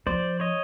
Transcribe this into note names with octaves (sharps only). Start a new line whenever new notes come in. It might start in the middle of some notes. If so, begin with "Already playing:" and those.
F3 C5 D5
C#5 D#5